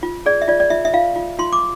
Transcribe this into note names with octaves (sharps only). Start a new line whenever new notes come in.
F4
G#4 D5
E5
F4 D5
D5
F4 E5
E5
F4 F5
F4
F4 C6
D6